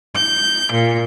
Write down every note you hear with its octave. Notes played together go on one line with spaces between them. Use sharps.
G6
A#2